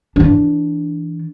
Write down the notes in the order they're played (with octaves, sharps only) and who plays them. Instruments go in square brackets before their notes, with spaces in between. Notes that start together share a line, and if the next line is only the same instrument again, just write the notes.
[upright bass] E3 D4